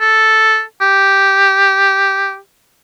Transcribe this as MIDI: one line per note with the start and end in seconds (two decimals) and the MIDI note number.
0.01 0.62 69
0.81 2.37 67